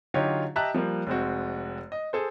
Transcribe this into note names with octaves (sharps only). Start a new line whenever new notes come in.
D3 F#3 D#4 F4 G4 C#5
G4 D#5 E5 A5 A#5 F#6
F3 G3 A#3
F1 G#3 C4 F#4
D#5
G#4 A4 C5